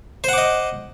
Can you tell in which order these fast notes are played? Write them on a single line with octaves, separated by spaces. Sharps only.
C5 F#5 D6 D#5